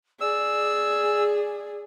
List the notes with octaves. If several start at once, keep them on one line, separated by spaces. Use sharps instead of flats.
G#4 D5 E6